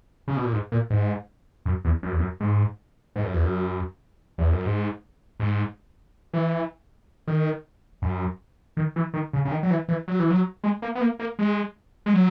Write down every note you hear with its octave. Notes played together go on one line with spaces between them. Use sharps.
C#3
B2
A#2
G#2
A#2
G#2
F#2
E2
F#2
E2
F#2
G#2
G#2
F#2
E2
F#2
E2
F#2
G#2
G#2
E3
D#3
F#2
D#3
E3
D#3
C#3
C#3
D#3
F#3
E3
E3
F#3
E3
F#3
G#3
A#3
B3
A#3
A#3
G#3
G#3
F#3